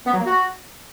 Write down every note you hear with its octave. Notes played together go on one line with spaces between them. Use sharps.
B3
F#3
A#3
F#4